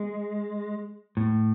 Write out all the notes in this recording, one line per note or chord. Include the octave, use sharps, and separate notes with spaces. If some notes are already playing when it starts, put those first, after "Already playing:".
Already playing: G#3
A2